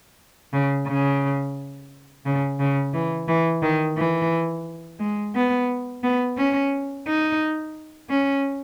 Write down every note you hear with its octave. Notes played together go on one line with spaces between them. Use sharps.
C#3
C#3
C#3
C#3
E3
E3
D#3
E3
G#3
B3
B3
C#4
D#4
C#4